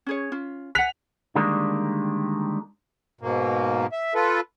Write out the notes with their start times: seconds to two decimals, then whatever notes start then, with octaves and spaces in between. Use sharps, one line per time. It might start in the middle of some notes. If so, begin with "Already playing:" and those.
0.06 C#4 G#4 C#5
0.32 C#4 F4
0.75 F#5 G#5 F#6 B6 F7
1.35 D3 D#3 G3 G#3 A#3 D4
3.21 G#2 B2 A#3
3.92 E5
4.15 F4 A4 B4